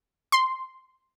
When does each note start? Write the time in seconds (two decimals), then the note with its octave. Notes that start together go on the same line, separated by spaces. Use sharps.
0.32 C6